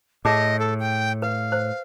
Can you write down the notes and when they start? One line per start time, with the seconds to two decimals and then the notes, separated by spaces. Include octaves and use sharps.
0.25 A2 G#4 D#5 A5 D6
0.59 A4
0.80 G5
1.22 B4 F5
1.52 C5